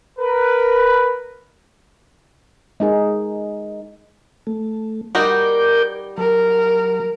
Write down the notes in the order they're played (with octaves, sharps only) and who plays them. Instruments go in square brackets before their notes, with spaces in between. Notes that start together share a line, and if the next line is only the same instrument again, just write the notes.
[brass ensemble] A#4 B4
[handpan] G#3 D#4 G#4
[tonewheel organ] A3
[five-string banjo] G3 D#4 F#4 [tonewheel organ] A#4 D6 G6
[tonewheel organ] F#3 [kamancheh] A#4